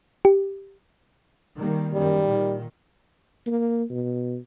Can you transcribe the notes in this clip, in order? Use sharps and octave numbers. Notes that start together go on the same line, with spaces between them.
G4
D#3 G3 A#3
F#2 D#3 G3
A#2 D#3
A#3
B2